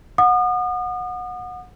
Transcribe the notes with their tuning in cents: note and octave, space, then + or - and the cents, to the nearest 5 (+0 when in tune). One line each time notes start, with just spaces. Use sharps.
F#5 -25 D#6 -40